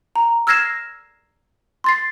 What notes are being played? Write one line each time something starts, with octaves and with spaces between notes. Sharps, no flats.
A#5
E6 F6 G#6 A#6 C7 E7
C6 A6 C7